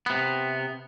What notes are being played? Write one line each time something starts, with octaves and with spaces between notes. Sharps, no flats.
C3 B3